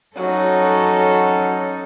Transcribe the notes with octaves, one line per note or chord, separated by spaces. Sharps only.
F#3 C#4 D#4 A4